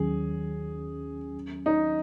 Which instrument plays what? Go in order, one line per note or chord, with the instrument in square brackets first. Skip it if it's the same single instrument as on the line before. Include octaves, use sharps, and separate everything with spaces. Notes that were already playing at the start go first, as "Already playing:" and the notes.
Already playing: [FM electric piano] D#2 D#3 F#3 C#4 [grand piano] G#4
[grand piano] D#4